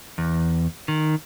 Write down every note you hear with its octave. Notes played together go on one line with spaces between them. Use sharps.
E2
D#3